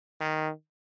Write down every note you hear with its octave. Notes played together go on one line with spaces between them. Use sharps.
D#3